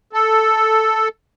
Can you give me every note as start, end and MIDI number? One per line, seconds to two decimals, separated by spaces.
0.13 1.08 69